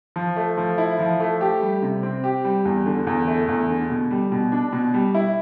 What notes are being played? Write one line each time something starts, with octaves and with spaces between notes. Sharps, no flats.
F3
A3
F3
E4
F3
A3
G4
G3
C3
C4
G4
G3
E2
D3
E2
A3
E2
D3
B2
G3
B2
D4
B2
G3
E4